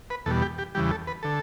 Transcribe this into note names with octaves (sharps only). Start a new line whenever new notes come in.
B4
E2 B2 G3 A4
G4
G4
E2 C#3 E3 G3 G4
A4
B4
D3 A4